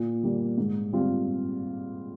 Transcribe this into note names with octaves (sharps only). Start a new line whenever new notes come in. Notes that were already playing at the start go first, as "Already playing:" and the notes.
Already playing: A#2
G3 A#3
G#2
G3 C4 F4